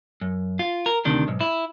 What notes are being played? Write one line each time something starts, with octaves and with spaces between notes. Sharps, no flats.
F#2
F4
A#4
D2 C3 D#3 D4
B1 G#2
E4